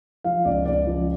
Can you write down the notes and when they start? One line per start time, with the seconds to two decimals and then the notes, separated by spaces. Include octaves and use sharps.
0.24 F3 F5
0.45 C#2 D5
0.66 C#2 D5
0.87 F3